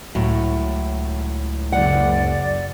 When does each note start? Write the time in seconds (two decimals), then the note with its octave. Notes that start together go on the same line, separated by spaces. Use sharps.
0.15 C#2 A2 F#3
1.72 F#1 D5 F#5